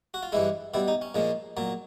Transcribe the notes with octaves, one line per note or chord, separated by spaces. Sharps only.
F#4
F4
G2 E3 G#3 E4
B2 G3 E4
D#4
C#4
A#2 F3 G#3
A#2 F#3